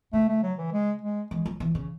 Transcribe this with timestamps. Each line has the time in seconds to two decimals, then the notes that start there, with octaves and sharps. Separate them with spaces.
0.13 C#3 A3
0.28 A3
0.43 F#3
0.58 E3
0.72 G#3
1.02 G#3
1.31 E3 G#3
1.46 F#3
1.60 E3
1.75 C#3